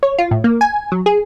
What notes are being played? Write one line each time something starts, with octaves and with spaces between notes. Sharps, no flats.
C#5
F4
A2
A#3
G#5
F#3
G#4